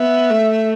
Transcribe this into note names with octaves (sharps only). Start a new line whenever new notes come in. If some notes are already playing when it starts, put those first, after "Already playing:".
Already playing: B3 E5
A3